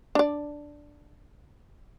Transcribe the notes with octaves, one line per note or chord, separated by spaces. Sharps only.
D4 D5